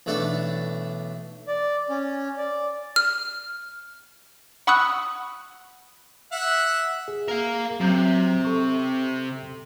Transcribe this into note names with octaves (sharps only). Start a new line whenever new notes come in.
B1 E3 A3 D4 A4
D5
C#4
D5
F6
F#5 B5 C#6 D#6 E6 F#6
E5 F#5
G#4
A#4 F5
C3 F#3 A#5 G6
A4 C#6